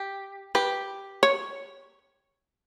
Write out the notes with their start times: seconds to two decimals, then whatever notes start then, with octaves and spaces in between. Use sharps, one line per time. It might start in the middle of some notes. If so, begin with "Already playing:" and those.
Already playing: G4
0.55 G4 B4
1.23 C#5